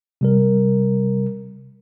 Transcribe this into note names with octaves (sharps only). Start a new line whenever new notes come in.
C3 G3 A#4